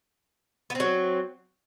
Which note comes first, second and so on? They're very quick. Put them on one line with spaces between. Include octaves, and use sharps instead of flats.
B3 C4 F#3